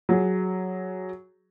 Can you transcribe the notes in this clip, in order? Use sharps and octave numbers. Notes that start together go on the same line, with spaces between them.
F#3 G#4